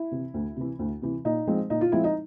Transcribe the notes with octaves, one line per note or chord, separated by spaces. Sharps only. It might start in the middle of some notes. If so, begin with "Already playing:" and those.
Already playing: E4
C3 E3
D2
C3 E3
D2
C3 E3
A#2 D#4
F3 G#3 C4
A#2 D#4
F4
F3 G#3 C4 E4
D#4